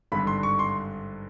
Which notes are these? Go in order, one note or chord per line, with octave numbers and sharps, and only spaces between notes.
G#1 G2 D3 B5
C6
C#6
C6